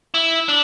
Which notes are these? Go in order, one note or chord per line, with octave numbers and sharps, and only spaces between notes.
E4
D4